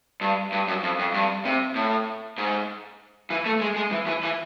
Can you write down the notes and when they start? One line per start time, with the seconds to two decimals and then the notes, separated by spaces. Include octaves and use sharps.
0.21 G2
0.52 G2
0.68 F#2
0.83 F2
0.99 F2
1.14 G2
1.45 C3
1.75 A2
2.38 G#2
3.30 E3
3.46 A3
3.61 G#3
3.76 G#3
3.91 E3
4.07 E3
4.23 E3